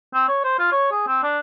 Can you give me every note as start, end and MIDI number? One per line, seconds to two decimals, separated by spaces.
0.14 0.25 60
0.28 0.43 73
0.44 0.58 72
0.59 0.71 65
0.72 0.86 73
0.91 1.03 68
1.07 1.19 60
1.23 1.39 62